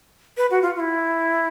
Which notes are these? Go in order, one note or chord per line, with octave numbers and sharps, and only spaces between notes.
B4
F#4
F4
F4
E4